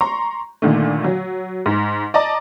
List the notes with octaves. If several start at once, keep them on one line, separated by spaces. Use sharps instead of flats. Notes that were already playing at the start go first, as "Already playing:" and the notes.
A#5 C6 C#6
A#2 D3 D#3 A3
F#3
G#2
D5 D#5 A5 A#5 D6